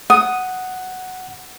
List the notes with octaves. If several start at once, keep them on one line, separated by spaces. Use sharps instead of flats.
F#5 D#6